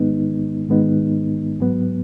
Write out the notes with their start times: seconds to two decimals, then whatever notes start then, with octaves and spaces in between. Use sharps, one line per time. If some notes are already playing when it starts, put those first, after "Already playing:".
Already playing: G#2 D#3 G#3 B3 D#4
0.69 G#2 D#3 G#3 B3 D#4
1.60 G#2 F#3 B3